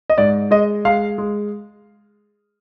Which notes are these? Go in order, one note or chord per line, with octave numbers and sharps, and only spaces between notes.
D#5
G#2 D5
G#3 D#5
G#3 F5
G#3